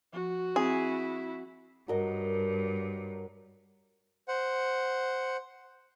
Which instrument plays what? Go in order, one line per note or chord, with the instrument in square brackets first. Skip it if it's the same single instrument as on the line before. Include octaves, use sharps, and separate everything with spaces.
[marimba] F3 [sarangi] F#4
[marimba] C4 [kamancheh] E4 [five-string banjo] G#4
[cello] G2 [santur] F#3 A#4 D#5
[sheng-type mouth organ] C5 F#5